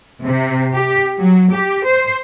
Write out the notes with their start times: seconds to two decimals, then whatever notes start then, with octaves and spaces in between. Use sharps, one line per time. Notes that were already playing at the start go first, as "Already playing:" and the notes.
0.23 C3
0.74 G4
1.18 F#3
1.54 G4
1.85 C5